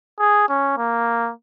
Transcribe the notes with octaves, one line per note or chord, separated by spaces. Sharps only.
G#4
C#4
A#3